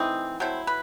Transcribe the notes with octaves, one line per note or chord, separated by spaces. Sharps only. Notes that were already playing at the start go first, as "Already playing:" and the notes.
Already playing: E3 A3 C4 D#4 D#5
F#3 A3 C4 E4 C5
B4